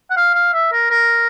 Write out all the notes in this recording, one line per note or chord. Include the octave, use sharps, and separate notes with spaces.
F#5
F5
F5
E5
A#4
A#4